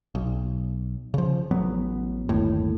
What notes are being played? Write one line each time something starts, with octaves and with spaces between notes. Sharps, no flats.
B1
C#3 F3
A1 F#3 B3
G1 D#2 A2